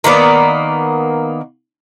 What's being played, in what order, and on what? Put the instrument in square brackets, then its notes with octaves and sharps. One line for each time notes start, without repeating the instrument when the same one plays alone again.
[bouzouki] D#3 A#3 B3 D5